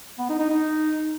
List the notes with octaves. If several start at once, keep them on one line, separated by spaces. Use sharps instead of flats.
B3
D#4
D#4
D#4